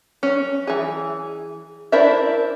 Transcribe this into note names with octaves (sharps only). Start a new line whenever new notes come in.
C#4
E3 G#4
D4 E4 A#4 C5 E5